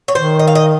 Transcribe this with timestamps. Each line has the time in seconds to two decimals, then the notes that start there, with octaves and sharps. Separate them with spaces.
0.08 C#5
0.15 D#3 C5
0.39 D#5
0.47 F5
0.55 D#5